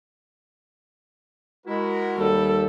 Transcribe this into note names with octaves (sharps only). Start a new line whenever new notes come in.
G#3 E4 F#4 A#4
D#2 G3 A4